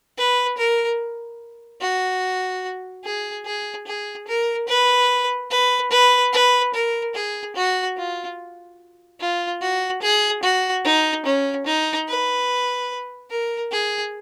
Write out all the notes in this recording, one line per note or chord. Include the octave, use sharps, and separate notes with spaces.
B4
A#4
F#4
G#4
G#4
G#4
A#4
B4
B4
B4
B4
A#4
G#4
F#4
F4
F4
F#4
G#4
F#4
D#4
C#4
D#4
B4
A#4
G#4